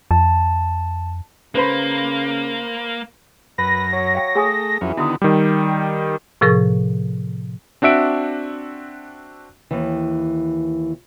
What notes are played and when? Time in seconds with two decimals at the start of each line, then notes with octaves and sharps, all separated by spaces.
0.11 F2 A5
1.55 C#3 A#3 B4 C5 B5
3.58 F#2 B4 A#6
3.92 F#3
4.15 F5 G5
4.35 A3 G#4 G#5 D#6
4.81 F2 E3 F#3 C#4
4.97 D3 D#3 B3 E4 F#4 D#6
5.22 D#3 G3
6.41 A2 C3 F3 G#4 A#4 C#6
7.82 C4 D4 F#4 E5 D7
9.71 D#2 E3